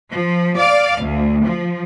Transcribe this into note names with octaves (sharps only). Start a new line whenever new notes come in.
F3
D5 F5
D2
F3